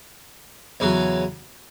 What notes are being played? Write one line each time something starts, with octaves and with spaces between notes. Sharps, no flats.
E2 C#3 F#3